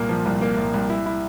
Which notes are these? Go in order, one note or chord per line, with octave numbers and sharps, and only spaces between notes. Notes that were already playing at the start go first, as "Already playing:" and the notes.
Already playing: C2 A#2 A#3
F3
C2
A#3
C2
C2
E4
E4